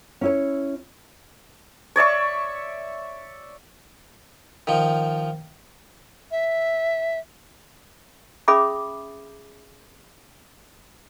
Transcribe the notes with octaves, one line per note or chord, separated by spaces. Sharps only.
C#4 E4 C#5
C#5 D5 E5 C#6
D#3 F3
E5
C#4 G#4 E5 B5 D6 D#6